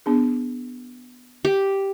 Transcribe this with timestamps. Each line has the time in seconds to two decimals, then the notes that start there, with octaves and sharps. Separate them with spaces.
0.06 B3 D4 G#4
1.45 G4